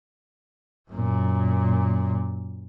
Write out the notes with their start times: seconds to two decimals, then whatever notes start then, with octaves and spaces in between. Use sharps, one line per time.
0.90 F#2 A#2